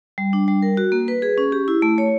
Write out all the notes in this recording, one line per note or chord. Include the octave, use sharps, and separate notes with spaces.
G3
D4
G3
A#4
F#4
A#3
B4
G#4
C#4
G4
E4
A3
C#5